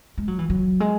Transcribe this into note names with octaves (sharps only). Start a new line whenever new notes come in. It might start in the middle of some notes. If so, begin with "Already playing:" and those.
G#3
F#3
E3
F#3
G#3